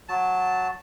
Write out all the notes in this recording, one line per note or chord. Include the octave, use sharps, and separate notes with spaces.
F#3 A5